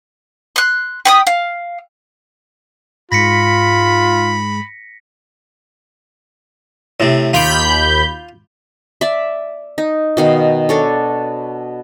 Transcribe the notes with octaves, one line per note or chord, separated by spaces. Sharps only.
C6 F#6
G5 B5 D#6
F5
G#2 F4 B5 A#6 B6 C#7
A2 C3
D#2 F4 B5 D6 G6
D5 E5
D#4
B2 D#3 F5
D4 A4 C#5